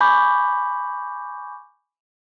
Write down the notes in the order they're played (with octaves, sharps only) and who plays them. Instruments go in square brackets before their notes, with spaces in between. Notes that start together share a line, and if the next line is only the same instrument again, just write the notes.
[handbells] G#5 B5 C#6 D6 G6